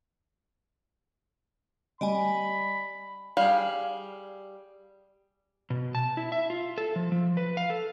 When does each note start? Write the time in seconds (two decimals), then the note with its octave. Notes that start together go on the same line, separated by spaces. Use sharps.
2.01 G3 D5 D#5 G#5 B5
3.37 G3 G#4 F5
5.70 B2
5.95 A5
6.17 E4
6.32 E5
6.50 F4
6.78 A4
6.96 F3
7.12 F3
7.37 B4
7.57 F5
7.70 A4